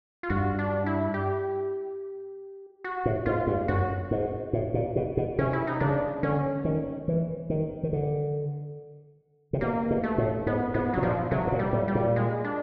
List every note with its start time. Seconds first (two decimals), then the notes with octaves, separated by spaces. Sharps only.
0.23 F4
0.30 G2 F#4
0.59 D4
0.86 E4
1.14 G4
2.84 F#4
3.06 A2
3.26 G#2 F4
3.47 G2
3.68 F#2 F#4
4.11 G#2
4.53 A2
4.74 A#2
4.96 B2
5.17 B2
5.38 C3 C#4
5.53 E4
5.67 D#4
5.80 C#3 D4
6.23 D3 C#4
6.65 D#3
7.08 E3
7.50 D#3
7.83 D#3
7.93 D3
9.53 C3
9.61 B2 A#3
9.90 B2
10.04 A3
10.18 A2
10.46 G#2 B3
10.74 G#2 B3
10.93 A2 F#3
11.02 A#2 F3
11.31 C3 F#3
11.47 A2
11.52 A#2
11.59 G3
11.73 A2
11.88 G3
11.95 A#2
12.16 G#3
12.44 D4